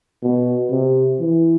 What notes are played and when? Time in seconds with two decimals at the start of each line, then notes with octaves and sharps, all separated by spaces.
0.22 B2
0.71 C3
1.20 E3